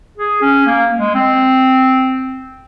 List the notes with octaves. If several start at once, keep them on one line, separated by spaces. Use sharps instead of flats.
G#4
C#4
A#3
G#3
C4